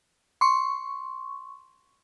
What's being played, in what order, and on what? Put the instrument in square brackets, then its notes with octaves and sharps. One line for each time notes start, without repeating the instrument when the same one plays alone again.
[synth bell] C6 C#6